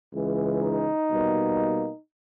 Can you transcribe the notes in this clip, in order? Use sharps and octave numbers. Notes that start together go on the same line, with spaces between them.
C#2 C#3 E3 G#3
D#4
B2 G3 A#3